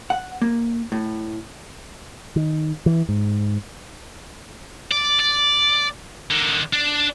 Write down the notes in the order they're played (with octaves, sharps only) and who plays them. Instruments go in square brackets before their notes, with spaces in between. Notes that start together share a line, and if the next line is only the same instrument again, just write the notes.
[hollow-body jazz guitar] F#5
A#3
A2
[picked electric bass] D#3
E3
G#2
[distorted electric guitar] D5
D5
D3 D#3
D4